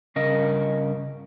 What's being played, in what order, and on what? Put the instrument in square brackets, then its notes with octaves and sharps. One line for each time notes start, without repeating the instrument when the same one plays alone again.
[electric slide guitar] G2 C#3 C#4 A#4 D#5